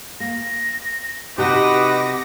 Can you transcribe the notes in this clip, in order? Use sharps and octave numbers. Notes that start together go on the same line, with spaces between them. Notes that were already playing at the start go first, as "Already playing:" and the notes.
A#3 A#6
C3 D#4 F#4 G4 B4 F#5 D6 A#6